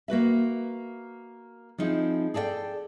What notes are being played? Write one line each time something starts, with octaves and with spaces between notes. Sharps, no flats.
A#3 F#4 B4 E5
F3 C4 D#4 E4 G#4
G#4 A4 D5 D#5 G5